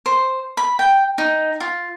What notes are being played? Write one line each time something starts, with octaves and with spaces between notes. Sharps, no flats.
C5
B5
G5
D#4
F4